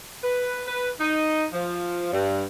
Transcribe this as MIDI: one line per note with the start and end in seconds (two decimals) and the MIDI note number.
0.24 0.62 71
0.67 0.90 71
1.00 1.45 63
1.53 2.12 53
2.13 2.44 43